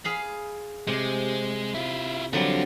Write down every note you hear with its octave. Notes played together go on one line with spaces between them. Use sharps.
G#4 F5 B5
C3 G#3
E4 F4
D3 F#3 G3 C4 F4